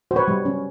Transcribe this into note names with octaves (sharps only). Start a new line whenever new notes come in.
F#4 C5
B4 C#5
G3
C#4